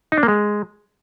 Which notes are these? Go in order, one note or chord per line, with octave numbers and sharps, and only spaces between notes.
D#4
D4
A#3
G#3